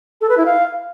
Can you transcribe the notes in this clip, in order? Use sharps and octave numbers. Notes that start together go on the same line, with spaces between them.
A4
B4
E4
F5